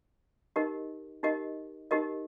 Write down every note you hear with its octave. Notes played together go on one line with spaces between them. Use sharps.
D#4 G4 A#4 D#5
D#4 G4 A#4 D#5
D#4 G4 A#4 D#5